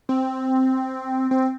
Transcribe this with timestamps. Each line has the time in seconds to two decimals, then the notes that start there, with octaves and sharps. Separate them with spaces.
0.09 C4
1.31 C4